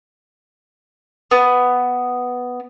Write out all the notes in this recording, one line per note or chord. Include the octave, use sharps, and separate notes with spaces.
B3